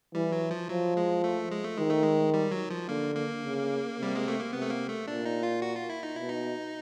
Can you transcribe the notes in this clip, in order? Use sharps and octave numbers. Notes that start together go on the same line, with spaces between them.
E3 G3
F#3
F3
F3 F#3
G#3
A3
G#3
A3
D#3 G#3
A3
G#3
G3
F#3
F3
D3 A#3
A#3
C#3
C3 G3
G#3
A3
A#3
C3 B3
A3
A#3
A3
A#2 D4
D#4
F4
F#4
F4
E4
D#4
B2 E4
D#4